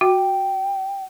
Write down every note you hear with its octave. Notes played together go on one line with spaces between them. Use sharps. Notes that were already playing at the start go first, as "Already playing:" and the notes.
F#4 G5